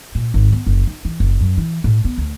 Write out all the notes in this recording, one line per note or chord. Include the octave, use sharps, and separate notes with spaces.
A#2
G#1
B3
F#1
D#4
E3
F#1
F#2
E3
A2
B3
D2